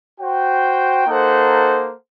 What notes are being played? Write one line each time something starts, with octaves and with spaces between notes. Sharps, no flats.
F#4 C5 G5
A#3 D#4 A4 C5 F#5